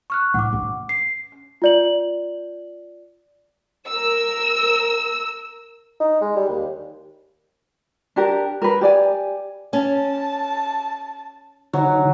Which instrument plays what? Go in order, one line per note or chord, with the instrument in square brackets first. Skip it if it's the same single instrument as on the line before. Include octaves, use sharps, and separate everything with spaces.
[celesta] C#6 F6 F#6
[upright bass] A2 [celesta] F#5 D6
[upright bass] C#4
[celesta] C7
F4 D5 F#7
[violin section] A#4 E6
[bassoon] D#4
G#3
G3
D#2
[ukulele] D4 G4 A#4
A#4 B4
G4 D5 G#5
[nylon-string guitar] C#4 [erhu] A5
[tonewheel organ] D3 D#4 [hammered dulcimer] F#3